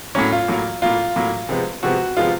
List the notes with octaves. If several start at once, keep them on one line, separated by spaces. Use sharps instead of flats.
A2 F#3 A#3 C#4
F4
A2 F#3 A#3
A2 F#3 A#3 F4
A2 F#3 A#3
C3 F3 G#3 B3
C3 F3 G#3 B3 F#4
C3 F3 G#3 B3 F4